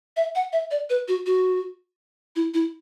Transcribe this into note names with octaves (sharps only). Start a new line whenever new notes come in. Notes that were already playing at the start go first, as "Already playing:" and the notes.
E5
F#5
E5
D5
B4
F#4
F#4
E4
E4